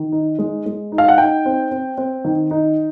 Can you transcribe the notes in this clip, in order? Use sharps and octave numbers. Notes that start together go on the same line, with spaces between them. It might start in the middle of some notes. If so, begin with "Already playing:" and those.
Already playing: D#3
D#4
G#3
G#3
D#4
F5
F#5
D#4 G5
C4
C4
C4
D#3
D#4